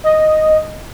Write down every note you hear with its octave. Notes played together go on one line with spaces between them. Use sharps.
D#5